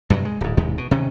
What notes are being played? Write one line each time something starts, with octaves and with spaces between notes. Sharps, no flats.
G2 C3 E3 F#3
G#3
D1 G#2
E1 D#2 C3 G#3
B2
C3 D#3 C#4